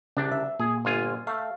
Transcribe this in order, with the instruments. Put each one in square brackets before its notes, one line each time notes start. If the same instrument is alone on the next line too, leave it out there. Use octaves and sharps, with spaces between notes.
[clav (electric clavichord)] C2 D4 [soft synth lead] C#3
[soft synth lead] E5
[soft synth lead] A#2 [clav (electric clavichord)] G#4
[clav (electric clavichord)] G1 F4 G#5
[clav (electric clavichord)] A3 [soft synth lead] F5